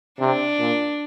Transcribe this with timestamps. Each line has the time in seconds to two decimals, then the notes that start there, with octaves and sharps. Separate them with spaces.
0.19 C3 D4
0.59 A#2